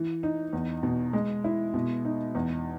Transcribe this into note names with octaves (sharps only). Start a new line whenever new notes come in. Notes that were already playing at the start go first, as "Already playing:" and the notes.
Already playing: E3
D#4
E2
B2
G#3
E4
B2
D#4
E2